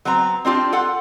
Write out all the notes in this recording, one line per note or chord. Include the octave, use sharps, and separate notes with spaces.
F#3 B3 C4 A#5
C4 D4 F4 G4
F4 A4 F#5